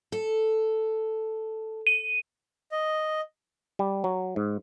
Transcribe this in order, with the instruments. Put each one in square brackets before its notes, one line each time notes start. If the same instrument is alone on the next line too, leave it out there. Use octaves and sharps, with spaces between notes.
[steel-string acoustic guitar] A4
[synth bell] D#7
[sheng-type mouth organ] D#5
[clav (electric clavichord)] G3
F#3
G#2